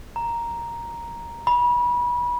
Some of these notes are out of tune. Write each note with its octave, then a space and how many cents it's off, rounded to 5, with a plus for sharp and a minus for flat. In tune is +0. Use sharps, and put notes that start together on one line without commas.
A#5 +0
B5 -30